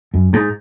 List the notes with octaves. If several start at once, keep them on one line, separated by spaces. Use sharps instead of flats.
F#2
G#2